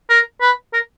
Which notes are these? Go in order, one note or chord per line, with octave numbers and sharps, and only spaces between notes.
A#4
B4
A#4